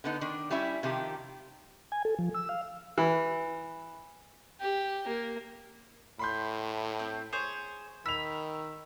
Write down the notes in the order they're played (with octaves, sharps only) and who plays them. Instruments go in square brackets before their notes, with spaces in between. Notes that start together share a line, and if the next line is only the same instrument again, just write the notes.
[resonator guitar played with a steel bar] D3 B3 D#4
D#3 D4
G3 C#4 E4 E5
C3 D#3 F3 G4
[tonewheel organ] G#5
A4
F3
E6
F5
[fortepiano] E3
[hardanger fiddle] G4
A#3
[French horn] A2 [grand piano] B5 C6 G6
[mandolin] C4
G#4 C5 C#5
[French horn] D#3 [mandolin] B5 [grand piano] E6 F7